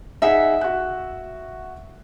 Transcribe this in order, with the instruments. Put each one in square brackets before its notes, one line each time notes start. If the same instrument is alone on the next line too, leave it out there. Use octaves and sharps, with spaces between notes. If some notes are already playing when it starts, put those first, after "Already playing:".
[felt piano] D#4 G#4 F#5 [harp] E5
[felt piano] F#4 F#6